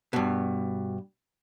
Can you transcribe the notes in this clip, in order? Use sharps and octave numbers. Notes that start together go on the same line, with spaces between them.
G2 B2